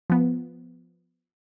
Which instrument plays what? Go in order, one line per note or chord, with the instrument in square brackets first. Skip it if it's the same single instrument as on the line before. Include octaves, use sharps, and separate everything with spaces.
[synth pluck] F3 B3